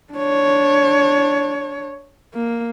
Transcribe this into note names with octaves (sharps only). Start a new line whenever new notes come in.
D4 C#5
A#3